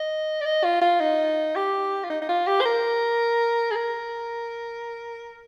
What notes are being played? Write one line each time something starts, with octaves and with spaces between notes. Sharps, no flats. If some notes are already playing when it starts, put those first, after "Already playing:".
Already playing: D#5
D5
D#5
F4
F4
D#4
G4
F4
D#4
D#4
F4
G4
C5
A#4
G#4
A#4